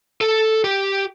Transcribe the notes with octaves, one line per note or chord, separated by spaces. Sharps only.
A4
G4